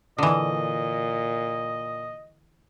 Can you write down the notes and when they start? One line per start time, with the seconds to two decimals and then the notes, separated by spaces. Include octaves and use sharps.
0.18 A#2 D3 E3 D#5